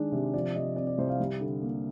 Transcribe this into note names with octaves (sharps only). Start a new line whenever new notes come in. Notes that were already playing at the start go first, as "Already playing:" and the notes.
Already playing: D#3 G#3 D4
C3
F3 D5
C3 D#5
C4 D5
D5
C2 C5
F5
G3
D3
A#3